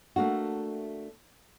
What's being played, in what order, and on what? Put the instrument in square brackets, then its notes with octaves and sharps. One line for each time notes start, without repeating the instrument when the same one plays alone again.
[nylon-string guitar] A3 A#3 D4 F#4